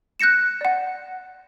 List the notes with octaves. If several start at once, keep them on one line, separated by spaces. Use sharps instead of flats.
F#6 G6 A#6 C#7 E7
D5 F#5